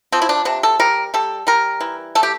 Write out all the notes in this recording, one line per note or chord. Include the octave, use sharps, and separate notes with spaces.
F3 C4
E4
D4
C3 D4
A4
G3 A#4
G3 A4
G3 A#4
E3
A3 A4
G4